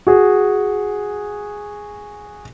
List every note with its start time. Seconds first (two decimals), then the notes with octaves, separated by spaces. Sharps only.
0.07 F#4 G#4